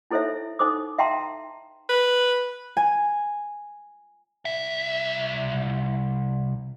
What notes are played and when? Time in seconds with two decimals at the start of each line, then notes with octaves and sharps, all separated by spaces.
0.11 D#4 E4 A4 C5 C#5 E5
0.59 D#4 A4 C5 D6 D#6
0.99 E5 F5 G5 A5 A#5 C6
1.89 B4
2.77 G#5
4.45 C2 E5